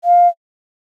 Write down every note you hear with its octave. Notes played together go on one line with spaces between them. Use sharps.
F5